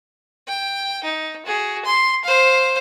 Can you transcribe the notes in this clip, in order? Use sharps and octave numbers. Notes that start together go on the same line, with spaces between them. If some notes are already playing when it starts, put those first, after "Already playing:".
G5
D#4
F#4 G#4
C6
C5 F5